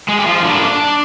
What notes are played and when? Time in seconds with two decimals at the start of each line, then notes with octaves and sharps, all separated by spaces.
0.08 G#3 G#4
0.19 G4
0.26 F3 F4
0.44 D3 G3 A#3 D4